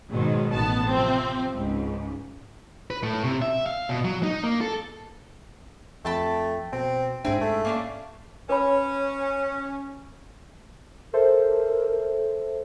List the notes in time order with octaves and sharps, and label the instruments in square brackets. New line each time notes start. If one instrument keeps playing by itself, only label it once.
[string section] G#2 B2 D#3 F#3 G#3
A1 B3 A5
C3 F3 C4
C#2 G#2
[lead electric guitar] B4
A2
C3
E5
F5
B2
F#3
D#4
A#3
A4
[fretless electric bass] F2 [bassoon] A3 [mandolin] G5 A5 B5
[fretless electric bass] B2 [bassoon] C4
[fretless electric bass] G#2 D4 [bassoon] C4 [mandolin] E4 G#4
[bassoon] A3
[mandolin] A#3 C#4 D4
[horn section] C#4 [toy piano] B4 C#5 B5
[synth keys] A4 C5 E5 [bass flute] A#4